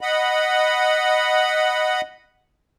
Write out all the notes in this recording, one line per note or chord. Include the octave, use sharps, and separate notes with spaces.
D#5 F#5 B5